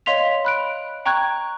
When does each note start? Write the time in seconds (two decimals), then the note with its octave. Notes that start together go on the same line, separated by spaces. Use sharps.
0.06 C#5 D#5 F5 C6 B6 F7
0.45 B5 F#6 D7
1.06 G5 A#5 C#6 F#6 G#6